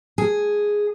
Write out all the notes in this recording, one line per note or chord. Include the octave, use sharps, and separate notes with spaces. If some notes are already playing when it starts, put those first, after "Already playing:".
G#4